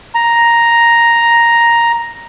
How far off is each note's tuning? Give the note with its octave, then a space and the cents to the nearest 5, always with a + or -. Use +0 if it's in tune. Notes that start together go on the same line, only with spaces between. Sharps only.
A#5 +5